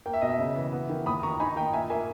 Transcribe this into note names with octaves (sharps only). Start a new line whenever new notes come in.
A#3 G5
E5
B2 D#5
E5
C#3
E3
B3
D#3
D#2 B5 D#6
D#3 A#5 C#6
D#4 G#5 B5
D#3 G5 A#5
A#2 E5 G#5
A#3 E5 G#5